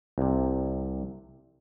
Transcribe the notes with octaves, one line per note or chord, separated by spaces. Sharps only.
C2 C3